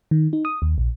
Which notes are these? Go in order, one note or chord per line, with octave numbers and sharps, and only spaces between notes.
D#3
D#4
D#6
D#2
A#1